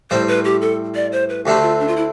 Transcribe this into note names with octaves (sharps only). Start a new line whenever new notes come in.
A2 G3 C4 C5
B4
G4
A4
D5
C5
B4
D2 D3 A3 C4 G4
F4
D4
F4
E4